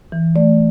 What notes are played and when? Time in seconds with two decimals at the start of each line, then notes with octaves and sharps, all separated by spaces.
0.12 E3
0.36 A3 D5